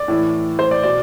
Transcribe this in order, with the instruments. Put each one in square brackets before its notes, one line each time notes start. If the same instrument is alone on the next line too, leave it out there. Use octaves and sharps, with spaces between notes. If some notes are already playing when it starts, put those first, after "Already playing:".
Already playing: [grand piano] D5
A2 E3
C5
D5
B2 D5